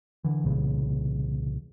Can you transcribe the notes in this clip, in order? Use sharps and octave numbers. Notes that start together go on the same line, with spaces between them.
D3 E3
C2 A#2 C#3 E3